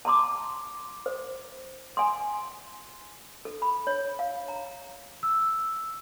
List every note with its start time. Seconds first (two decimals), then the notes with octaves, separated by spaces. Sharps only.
0.05 A5 A#5 C6 D6
1.06 C5
1.97 G#5 C6
3.45 A4
3.62 B5
3.87 C#5
4.19 F5
4.48 A#5
5.23 E6